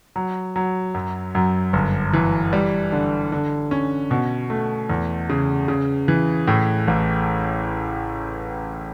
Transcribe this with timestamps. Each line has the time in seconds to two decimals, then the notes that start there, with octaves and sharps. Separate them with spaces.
0.16 F#3
0.56 F#3
0.94 F#2
1.35 F#2
1.73 G1
2.13 E3
2.53 G3
2.92 D3
3.32 D3
3.71 C#4
4.11 B2
4.50 A3
4.90 E2
5.29 C#3
5.68 C#3
6.08 E3
6.48 A2
6.88 A1